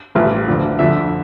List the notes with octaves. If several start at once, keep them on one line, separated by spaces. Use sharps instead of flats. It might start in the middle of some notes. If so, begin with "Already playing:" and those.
A1 G2 F3
D2 D3 F3
F2 D3 F3 E5